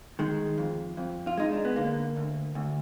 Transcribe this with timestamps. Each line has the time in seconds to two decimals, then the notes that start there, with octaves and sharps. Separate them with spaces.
0.19 D#3 G#3
0.58 F2
0.97 F2
1.27 F4
1.37 G#3 D#4
1.52 D4
1.65 B3
1.76 D3 A#3
2.16 D2
2.55 D2